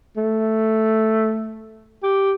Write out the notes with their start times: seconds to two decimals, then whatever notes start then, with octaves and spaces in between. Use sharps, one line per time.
0.17 A3
2.03 G4